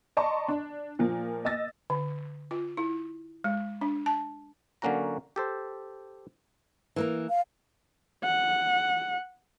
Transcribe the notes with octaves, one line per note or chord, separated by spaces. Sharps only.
D5 D#5 A5 A#5 C6 C#6
D4
A#2 F3 A#3
D#5 E6 A6 A#6
D3
F4
E4
G#3
D4
A5
D3 F#3 A#3 C#4 F#4 A#5
G4 A4 C5
E3 A#3 A#4
F5
F#5